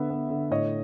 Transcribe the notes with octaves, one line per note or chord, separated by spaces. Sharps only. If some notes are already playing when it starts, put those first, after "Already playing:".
Already playing: D3 B3 E5
B3
D3
A2 C#5 D#5